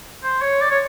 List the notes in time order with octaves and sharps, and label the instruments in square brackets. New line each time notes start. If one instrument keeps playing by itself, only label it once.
[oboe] C5
C#5
D5
C#5